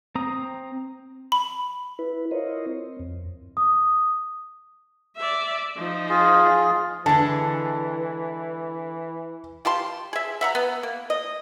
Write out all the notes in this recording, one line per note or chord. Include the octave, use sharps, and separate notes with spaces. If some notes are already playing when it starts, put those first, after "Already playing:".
C4 A#5 D#6
B5
E4 B4
E4 F4 A#4 C5 C#5 D#5
C4
F2
D#6
D5 E5
F3 D#4
F4 G#4
D3 E3 G#3 A5
F4 G4 A5 C6
G#4 E5
E5 F#5 A#5
B3
A#3
D#5